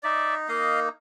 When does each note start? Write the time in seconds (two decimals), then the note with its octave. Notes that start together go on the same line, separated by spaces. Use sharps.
0.03 D#4 D5 E5
0.48 A#3 D#5 F5